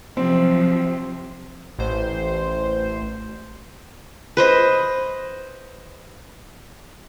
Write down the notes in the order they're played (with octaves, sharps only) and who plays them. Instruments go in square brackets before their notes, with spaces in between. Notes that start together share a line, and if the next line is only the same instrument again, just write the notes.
[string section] C3 F3 F#3 [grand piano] C4
[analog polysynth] A1 C5
[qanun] B4 C5 D#5